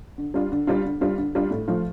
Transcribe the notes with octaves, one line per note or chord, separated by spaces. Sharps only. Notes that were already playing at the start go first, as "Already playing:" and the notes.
D3
G3 D4 F4
D3
G3 D4 F4
D3
G3 D4 F4
D3
G3 D4 F4
A2
F3 A3 F4